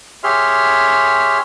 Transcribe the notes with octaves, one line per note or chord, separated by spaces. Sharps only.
G4 G#4 C#5 E5 C6 F6